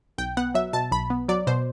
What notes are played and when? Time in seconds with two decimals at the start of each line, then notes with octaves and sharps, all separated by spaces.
0.18 B1 G5
0.37 B3 F#5
0.54 F#3 E5
0.73 B2 A5
0.92 B1 B5
1.10 B3
1.29 F#3 D5
1.47 B2 C5